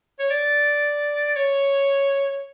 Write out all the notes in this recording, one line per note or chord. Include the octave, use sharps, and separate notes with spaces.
C#5
D5
C#5